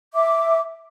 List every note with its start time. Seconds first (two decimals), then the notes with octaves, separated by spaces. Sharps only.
0.14 E5 D6